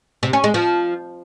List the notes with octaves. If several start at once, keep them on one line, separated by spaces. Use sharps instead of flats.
C3
C#4
G#3
F3